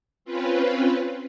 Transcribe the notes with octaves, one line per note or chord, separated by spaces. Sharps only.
C4 C#4 F4 B4